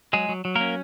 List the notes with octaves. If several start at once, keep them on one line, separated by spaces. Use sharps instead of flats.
F#3 G#3 G#4
F#3
F#3
A#3 A#4
C#4